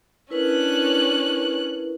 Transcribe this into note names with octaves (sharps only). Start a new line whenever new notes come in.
C#4 D4 E4 A#4 B4 F#6